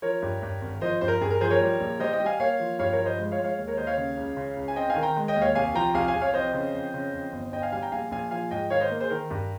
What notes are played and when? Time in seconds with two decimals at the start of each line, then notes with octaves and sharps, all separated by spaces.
0.02 F3 A#4 C#5
0.22 G2
0.42 G2
0.61 G#1
0.81 F3 C5 D#5
1.01 G2 C5
1.08 A#4
1.21 G2 G#4
1.30 A#4
1.40 F3 G#4 C5
1.50 A#4 C#5
1.61 G3
1.80 A#1
1.99 G3 C5 D#5
2.13 D#5 G5
2.20 G3
2.26 F5 G#5
2.40 A#3 C#5 F5
2.60 F3
2.79 G2 C#5 F5
2.93 A#4 C#5
2.99 F3
3.05 C5 D#5
3.18 G#3
3.32 C#5 F5
3.38 G#3
3.44 C#5 F5
3.58 D#2
3.68 A#4 C#5
3.77 D#2 C5 D#5
3.87 C#5 F5
3.97 C#3
4.17 C#2
4.37 C#3
4.57 C#2
4.68 G#5
4.76 C4 D#5 G5
4.90 F5 G#5
4.96 D#3
5.03 G5 A#5
5.16 G#3
5.28 D#5 G5
5.36 D#2
5.41 C#5 F5
5.55 C2 F5 G#5
5.75 F3 G5 A#5
5.94 C2 F5 G#5
6.08 F5 G#5
6.15 C2
6.22 C#5 F5
6.34 F2 C5 D#5
6.54 C#3
6.73 F2
6.94 C#3
7.13 F2
7.32 G1
7.52 G1 D#5 G5
7.62 F5 G#5
7.72 G3 F5 G#5
7.82 G5 A#5
7.92 A#1 F5 G#5
8.11 A#1 F5 G#5
8.31 F3 F5 G#5
8.51 G#2 D#5 G5
8.70 D#3 C#5 F5
8.80 C5 D#5
8.90 A#3
9.00 G#4 C5
9.10 D#3 A#4
9.30 G2